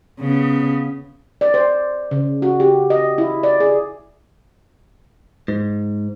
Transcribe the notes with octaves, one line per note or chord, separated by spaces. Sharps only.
C#3 B3
D5
C5
C#3
F#4
G4
D#5
E4
D5
G#4
G#2